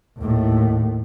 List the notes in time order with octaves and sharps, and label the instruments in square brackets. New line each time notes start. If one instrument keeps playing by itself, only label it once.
[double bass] D#2 A2